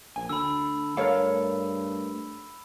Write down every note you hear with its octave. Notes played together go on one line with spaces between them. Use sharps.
A#1 G#5
D2 D3 B5 E6
G2 A3 A4 A#4 C#5 F5